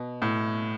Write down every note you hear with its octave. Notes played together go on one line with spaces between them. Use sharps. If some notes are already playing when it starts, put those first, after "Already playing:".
Already playing: B2
A2